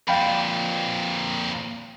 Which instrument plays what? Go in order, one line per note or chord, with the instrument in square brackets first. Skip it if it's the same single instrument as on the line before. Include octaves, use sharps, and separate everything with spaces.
[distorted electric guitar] F2 A#2 [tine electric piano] F5 G5 B5